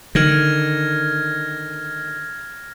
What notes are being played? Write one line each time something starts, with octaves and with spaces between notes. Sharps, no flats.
D3 D#3 F6 G#6 A#6